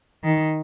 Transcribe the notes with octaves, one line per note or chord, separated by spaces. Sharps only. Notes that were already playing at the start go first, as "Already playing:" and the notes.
D#3